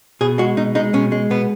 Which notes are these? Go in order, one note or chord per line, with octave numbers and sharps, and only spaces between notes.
B2 G#4
G#3 F#4
B2 D#4
G#3 D#4
B2 C#4
G#3
B2 B3